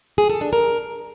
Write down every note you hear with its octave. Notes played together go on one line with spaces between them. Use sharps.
G#4
A4
D4
A#4